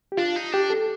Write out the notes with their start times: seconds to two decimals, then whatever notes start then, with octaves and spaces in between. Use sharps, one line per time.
0.12 G4
0.18 D4 F4
0.36 D#4
0.53 D4 G4
0.70 A4